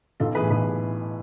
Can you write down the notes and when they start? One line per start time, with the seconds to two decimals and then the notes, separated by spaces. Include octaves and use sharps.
0.20 B1 F4 A4
0.35 E3 G#4 B4
0.39 A2
0.51 B1 G#4 B4